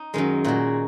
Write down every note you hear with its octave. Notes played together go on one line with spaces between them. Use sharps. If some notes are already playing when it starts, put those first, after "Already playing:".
Already playing: D#4
F#2 D#3 G#3
A#2 G#3 F#4